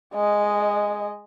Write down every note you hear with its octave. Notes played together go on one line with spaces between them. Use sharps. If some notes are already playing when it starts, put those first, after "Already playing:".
G#3 D#5